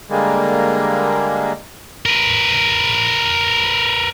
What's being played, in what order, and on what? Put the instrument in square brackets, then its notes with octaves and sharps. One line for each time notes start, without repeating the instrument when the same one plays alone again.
[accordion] D3 G3 G#3 A#3
[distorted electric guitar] A#4 B4